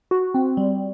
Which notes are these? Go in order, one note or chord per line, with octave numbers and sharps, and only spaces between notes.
F#4
C4
G3